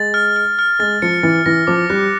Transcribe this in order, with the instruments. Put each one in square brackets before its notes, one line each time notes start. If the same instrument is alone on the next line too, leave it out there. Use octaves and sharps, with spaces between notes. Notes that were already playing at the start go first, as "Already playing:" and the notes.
Already playing: [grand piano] G#3 [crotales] A6
[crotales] F6
F6
F6
[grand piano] G#3 [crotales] A6
[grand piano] F3 [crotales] C#7
[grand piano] E3 [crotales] A6
[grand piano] E3 [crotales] A#6
[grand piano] F3 [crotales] D6
[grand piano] G3 [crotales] F#6